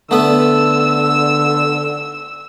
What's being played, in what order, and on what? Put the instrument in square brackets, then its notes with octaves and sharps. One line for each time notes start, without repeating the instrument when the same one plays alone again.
[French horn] D3 [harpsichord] A3 B3 B4 [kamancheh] E6